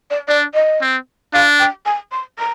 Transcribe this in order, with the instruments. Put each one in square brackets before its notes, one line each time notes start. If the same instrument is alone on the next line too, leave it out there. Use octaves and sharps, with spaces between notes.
[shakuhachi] D5
[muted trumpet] D4 [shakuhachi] D5
[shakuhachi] D#5
[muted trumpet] C4
[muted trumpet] D4 [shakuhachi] F5
[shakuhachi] G5
G#5
C6
A#5